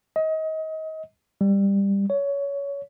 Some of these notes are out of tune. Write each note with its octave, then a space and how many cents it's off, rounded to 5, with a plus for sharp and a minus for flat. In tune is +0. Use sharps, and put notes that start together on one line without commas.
D#5 +30
G3 +15
C#5 +20